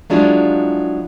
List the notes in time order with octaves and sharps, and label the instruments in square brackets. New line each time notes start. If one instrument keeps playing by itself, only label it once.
[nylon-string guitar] F3 F#3 G#3 D4 E4 F4